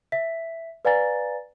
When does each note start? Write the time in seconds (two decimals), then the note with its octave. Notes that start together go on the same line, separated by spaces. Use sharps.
0.12 E5 B6
0.85 B4 D5 F5 G#5 A#5 A6